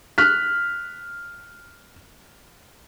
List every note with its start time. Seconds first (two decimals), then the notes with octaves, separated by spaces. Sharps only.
0.18 F6 F#6 B6